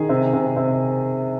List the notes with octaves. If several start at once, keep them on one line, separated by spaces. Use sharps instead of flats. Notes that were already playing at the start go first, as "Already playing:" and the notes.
Already playing: D#3 G#4
C3
C3
C3